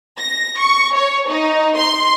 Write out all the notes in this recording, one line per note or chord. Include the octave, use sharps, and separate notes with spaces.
A#6
C#6
C#5
D#4
C6